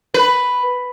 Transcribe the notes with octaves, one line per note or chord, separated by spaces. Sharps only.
B4